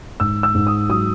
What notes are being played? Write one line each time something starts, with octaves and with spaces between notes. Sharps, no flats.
G#2 E6
E6
G#2
D#6
F#3 D#6